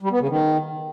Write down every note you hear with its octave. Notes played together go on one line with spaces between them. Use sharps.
G3
B3
C#3
D#3